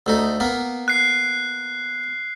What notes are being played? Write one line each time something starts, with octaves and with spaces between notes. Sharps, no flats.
D2 A3 D#4
A#3 B3
F#6 C7